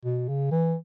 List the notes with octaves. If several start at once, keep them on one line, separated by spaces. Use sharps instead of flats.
B2
C#3
E3